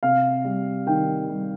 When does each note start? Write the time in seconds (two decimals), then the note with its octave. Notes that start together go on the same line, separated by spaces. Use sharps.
0.03 C3 F5
0.44 G3
0.87 D#3 G5
1.29 G3